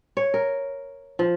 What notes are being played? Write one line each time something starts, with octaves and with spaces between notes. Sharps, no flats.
C#5
A#4
F3